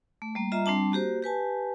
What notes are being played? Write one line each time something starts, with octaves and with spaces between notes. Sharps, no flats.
A3
G3 A#3
G3 F4 D#5 E5 A#5
G3 C4 D4 A5
A#3 F#4 G4 C5
G4 B4 G#5 A5